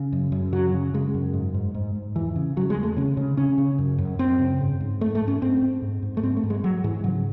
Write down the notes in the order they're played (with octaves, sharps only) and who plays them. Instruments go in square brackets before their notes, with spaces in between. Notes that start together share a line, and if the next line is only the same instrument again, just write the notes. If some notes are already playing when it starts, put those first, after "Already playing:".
Already playing: [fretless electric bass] C#3
F#2
F#2
C#3 F#3
C#3
C#3 G#3
F#2
G#2
G#2
G#2
G#2
E2 E3
C#3
C#3 F#3
G#3
E2
A3
C#3 C#4
C#3
C#3 C#4
C#3
F#2
F#2
F#2 C4
C#3
G#2
G#2
G#2 A3
A3
G#2
C#4
G#2 C4
G#2
G#2
G#2
A3
G#2 C4
A3
G#2
G#3
G#2 F#3
G#2 E3
C#3 F#3